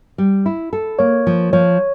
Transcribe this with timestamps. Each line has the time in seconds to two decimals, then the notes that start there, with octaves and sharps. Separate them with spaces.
0.18 G3
0.46 E4
0.73 A4
0.99 A#3 C#5
1.27 F3
1.53 F3 C#5